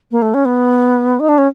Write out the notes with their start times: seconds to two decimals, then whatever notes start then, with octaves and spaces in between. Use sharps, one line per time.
0.11 A#3
0.22 A3
0.34 C#4
0.45 B3
1.20 D#4
1.29 D4
1.38 C#4